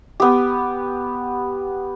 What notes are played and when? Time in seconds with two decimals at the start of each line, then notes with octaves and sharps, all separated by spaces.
0.20 B3 G4